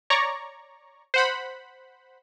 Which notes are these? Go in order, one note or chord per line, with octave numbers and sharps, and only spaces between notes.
C#5 D5 A#5 C#6
C5 F#5 B5